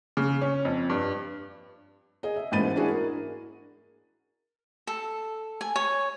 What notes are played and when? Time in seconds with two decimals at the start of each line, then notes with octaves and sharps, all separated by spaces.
0.17 C#3
0.41 C#4
0.65 F2
0.90 G2
2.23 G#4 D#5
2.36 E5
2.52 A1 G#2 A#3 B5 A6 D#7
2.76 D4 E4 F#4 G#4
2.88 A#4
4.87 A4
5.61 G#5
5.76 C#5